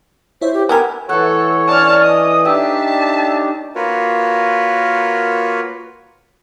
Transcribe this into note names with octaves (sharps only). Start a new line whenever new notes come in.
E4 C5 C#5 E5
G4
B3 G4 A#4 G5 G#5 B5 E6
E3 A3 A4 C#5 F#5
C#4 D4 A5 F6
D#5 D#6
D4 D#4 G4 E5 G5 A5
A#3 F4 F#4 A#4 B4 C#5